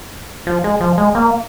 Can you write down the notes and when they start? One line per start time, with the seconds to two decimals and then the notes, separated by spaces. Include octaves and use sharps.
0.47 F3
0.64 G#3
0.81 F3
0.98 G#3
1.15 A#3